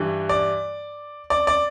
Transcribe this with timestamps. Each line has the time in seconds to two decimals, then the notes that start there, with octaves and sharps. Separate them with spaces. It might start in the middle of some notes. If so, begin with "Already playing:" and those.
Already playing: G2 E3 G3
0.29 D5
1.30 D5
1.47 D5